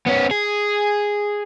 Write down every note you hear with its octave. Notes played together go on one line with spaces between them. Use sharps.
B3 C#4
G#4